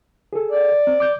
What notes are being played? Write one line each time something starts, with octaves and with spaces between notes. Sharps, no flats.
G#4 A4
D5
C4
D6 G6